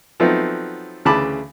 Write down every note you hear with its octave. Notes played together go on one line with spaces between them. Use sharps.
F3 F#3 A3 B3 C4 D#4
D2 C#3 E3 A5 B5 D6